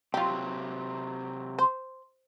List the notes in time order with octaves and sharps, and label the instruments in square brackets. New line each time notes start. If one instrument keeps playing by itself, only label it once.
[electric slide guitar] C3 F#3 [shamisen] F4 G4
[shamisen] C5